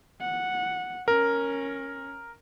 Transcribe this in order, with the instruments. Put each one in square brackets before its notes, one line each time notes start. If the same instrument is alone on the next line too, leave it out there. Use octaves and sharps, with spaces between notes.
[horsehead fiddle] F#5
[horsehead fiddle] C#4 [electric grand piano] A#4